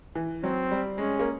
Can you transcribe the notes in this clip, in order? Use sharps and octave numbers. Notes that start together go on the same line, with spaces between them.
E3
F#3 C4
G3
G#3 C#4
A#3